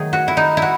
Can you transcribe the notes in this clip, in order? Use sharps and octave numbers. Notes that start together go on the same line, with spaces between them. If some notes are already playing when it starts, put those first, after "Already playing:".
Already playing: D#3 F#3 A3 G#4
F#4
E4
D#4
E4
F#4